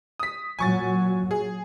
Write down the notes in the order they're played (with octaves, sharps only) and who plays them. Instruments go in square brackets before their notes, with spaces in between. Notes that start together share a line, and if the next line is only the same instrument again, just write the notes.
[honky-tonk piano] D#6 B6
[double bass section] A#2 F#3 [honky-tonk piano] G#5 C#6 A6
[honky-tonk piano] G#4